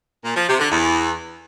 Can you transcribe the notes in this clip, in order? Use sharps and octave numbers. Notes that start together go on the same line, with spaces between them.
A#2
F3
C3
D3
E2